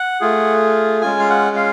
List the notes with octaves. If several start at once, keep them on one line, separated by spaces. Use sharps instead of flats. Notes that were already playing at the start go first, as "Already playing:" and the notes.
Already playing: F#5
A3 F4 G#4
G#3 C#4 F4 G#5
F5
F#5
F5